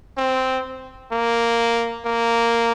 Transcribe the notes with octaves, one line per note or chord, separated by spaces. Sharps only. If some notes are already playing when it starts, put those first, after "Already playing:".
C4
A#3
A#3